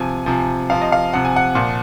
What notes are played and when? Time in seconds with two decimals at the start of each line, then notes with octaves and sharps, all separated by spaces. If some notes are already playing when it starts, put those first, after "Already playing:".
Already playing: C3 F3 G#5
0.26 C3 F3
0.70 C3 F3 F5
0.81 D#5
0.92 F5
1.13 C3 F3 F#5
1.25 G#5
1.36 F#5
1.55 A#2 F3